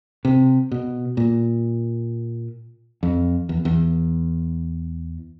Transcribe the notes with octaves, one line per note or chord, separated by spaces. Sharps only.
C3
B2
A#2
F2
E2
E2